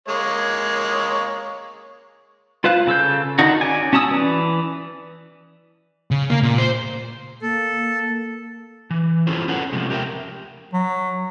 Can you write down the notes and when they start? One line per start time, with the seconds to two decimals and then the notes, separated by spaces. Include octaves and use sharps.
0.08 G#3 A#3 C#5
2.64 F4 B4 C5 F5 F#6
2.87 C#3 A4 E6 G6
3.39 D3 D#3 D4 D#4 F#4
3.61 C#4 D5 G#5
3.93 C#4 F#4 A5 D#6 E6
4.10 E3 B4 D5
6.11 C#3
6.30 A#3
6.42 A#2
6.58 C5
7.42 A#3 A4
8.90 E3
9.27 C#4 E4 F4 G4 A4 C5
9.48 C#4 G#4 A4 B4 F#5
9.72 C3 F3 G#3 A3
9.90 G4 A#4 D5 E5 G5
10.73 F#3